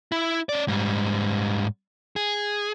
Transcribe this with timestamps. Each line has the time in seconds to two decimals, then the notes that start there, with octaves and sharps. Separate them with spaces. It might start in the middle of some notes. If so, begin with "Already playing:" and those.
0.12 E4
0.49 C#4 D5
0.68 G#2 G3
2.16 G#4